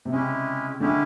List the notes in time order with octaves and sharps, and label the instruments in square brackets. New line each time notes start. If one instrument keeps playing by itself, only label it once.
[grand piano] C3
[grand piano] C#3 [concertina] G#3 C#4 E4 G4
[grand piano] D3 [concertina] G#3 C#4 E4 G4